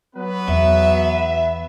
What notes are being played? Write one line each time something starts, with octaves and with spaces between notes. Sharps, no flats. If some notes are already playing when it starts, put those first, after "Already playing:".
F#3 B3 B4
E2 E5